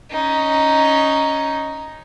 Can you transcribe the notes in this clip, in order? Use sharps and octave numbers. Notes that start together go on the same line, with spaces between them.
C#4 D#4